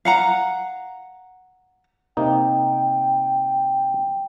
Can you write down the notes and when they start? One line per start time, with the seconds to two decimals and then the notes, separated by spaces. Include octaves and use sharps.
0.05 F5 F#5 A#5
2.17 C3 A#3 D#4 G5